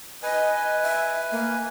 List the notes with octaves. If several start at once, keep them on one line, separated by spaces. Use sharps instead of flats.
B4 D#5 G#5
E5
A#3